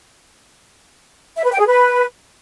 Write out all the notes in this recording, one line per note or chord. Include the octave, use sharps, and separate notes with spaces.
E5
B4
G5
G#4
B4